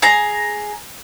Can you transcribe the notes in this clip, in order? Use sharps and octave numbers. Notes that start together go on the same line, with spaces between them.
G#4 A#5